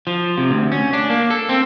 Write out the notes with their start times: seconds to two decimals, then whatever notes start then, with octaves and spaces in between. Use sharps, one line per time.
0.07 F3
0.38 C3
0.51 D2
0.72 C#4
0.93 D4
1.10 A#3
1.30 A4
1.49 C4